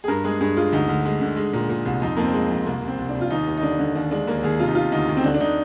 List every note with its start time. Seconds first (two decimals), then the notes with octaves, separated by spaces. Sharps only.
0.04 G#4
0.08 G2 A#4
0.24 G#3 G#4
0.41 G2 G#4
0.57 G#3 F4
0.73 D2 D#4
0.89 D2
1.05 G#3
1.21 D3
1.37 G#3
1.53 A#2
1.69 A#2
1.85 C2
2.02 F2 D#4
2.17 F2 A#3
2.23 C4
2.34 G#3
2.50 F2
2.66 C2 A#3
2.82 C2
2.87 C4
2.98 C2
3.09 D4
3.15 C2
3.21 F4
3.30 D#2 D#4
3.47 D#2
3.57 D#4
3.63 D3 D4
3.79 D3
3.95 D#2 D4
4.11 G#3 D4
4.27 D#2 A#3
4.43 D#2 G#4
4.60 C3 F4
4.67 D#4
4.75 C3 F4
4.92 D2 D#4
5.08 D2
5.17 C4
5.24 D3 D4
5.34 D4
5.40 D3 D#4